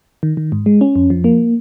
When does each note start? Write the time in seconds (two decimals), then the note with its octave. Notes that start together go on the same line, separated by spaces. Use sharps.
0.23 D#3
0.37 D#3
0.52 G#2
0.66 G#3
0.81 C#4
0.96 F2
1.10 F3
1.24 A#3